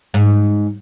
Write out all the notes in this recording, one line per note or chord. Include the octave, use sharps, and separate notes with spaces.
G#2